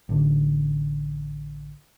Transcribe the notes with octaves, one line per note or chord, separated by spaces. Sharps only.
A1 D3